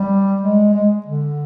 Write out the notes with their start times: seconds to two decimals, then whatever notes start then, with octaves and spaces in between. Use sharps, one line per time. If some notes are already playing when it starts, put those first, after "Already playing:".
Already playing: G3
0.41 G#3
0.74 G#3
1.06 D3